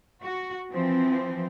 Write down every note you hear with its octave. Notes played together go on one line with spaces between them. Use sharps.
F#4
E3 F3 C4